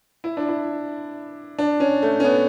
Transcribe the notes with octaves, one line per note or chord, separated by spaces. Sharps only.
E4
D4
E4
D4
C#4
A3
C#4
B3